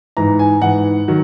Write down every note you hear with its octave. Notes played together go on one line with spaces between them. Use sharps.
G#2 E3 A#5
G#5
G#2 E3 F#5
D#3 F#3